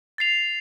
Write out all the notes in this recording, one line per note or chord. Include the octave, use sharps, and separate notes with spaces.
A6 C7 F7